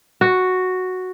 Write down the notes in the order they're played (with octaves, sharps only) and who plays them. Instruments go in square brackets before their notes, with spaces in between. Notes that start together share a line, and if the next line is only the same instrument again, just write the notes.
[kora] F#4